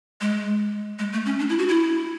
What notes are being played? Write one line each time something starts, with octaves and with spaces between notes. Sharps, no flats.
G#3
G#3
A3
C#4
D4
E4
F#4
E4